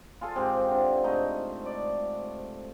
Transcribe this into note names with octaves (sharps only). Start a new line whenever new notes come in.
F4 G#4 A4 F5
G#2 C4 G4
D3
G#2 A3 D#4 D#5
D5